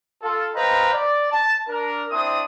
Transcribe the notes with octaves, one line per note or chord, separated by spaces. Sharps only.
F4 A4
B4 C5 D#5 F5 G5 A#5
D5
A5
D4 A#4
C4 D4 E4 D#6